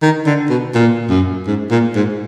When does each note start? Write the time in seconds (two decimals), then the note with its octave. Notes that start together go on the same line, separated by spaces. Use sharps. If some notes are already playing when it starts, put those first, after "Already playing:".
0.02 D#3
0.26 D3
0.49 B2
0.75 A#2
1.10 F#2
1.47 G#2
1.70 A#2
1.95 G#2